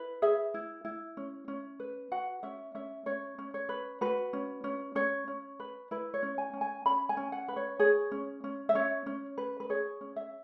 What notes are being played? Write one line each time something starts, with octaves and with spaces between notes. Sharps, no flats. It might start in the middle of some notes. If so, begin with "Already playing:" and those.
Already playing: E4 B4
G#4 E5
E4
E4
C#4
C#4
B4
F#4 F#5
C#4 E5
C#4 E5
C#4 C#5
C#4
C#5
B4
F#4 B4
C#4
C#4
C#4 C#5
C#4
B4
E4 B4
C#5
C#4
G#5
C#4
G#5
C#4 B5
G#5
C#4
F#5
B4
C#5
G#4 C#5
C#4
C#4
E5
C#4 C#5
C#4
B4
B4
G#4 C#5
C#4
E5